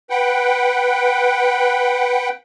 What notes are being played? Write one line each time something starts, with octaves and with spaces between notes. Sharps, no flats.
B4 F#5 G5